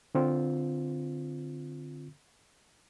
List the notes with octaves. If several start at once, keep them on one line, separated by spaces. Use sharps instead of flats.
D3 C4 F4